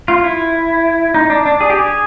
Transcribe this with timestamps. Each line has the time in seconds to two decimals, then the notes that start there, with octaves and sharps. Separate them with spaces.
0.08 F4
0.24 E4
1.14 D#4
1.30 D4
1.45 D4
1.61 G#4
1.70 G4
1.78 G#4